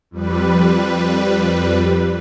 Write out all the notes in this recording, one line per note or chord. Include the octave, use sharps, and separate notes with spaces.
F2 G3 B4